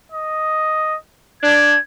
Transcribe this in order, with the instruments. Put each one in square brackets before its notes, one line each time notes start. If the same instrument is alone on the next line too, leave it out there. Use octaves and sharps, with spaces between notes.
[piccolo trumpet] D#5
[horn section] D4 [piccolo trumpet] G#6